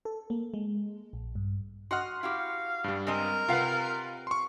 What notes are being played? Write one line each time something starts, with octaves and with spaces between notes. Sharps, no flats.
A4
A#3
G#3
A#1
G2
F#4 D#5 F#5 C6 F6
E4 F#4 G4 F5
G2 G3
G#3 C4 A#4 D#5
C3 F4 B4 F5 F#5
C6 C#6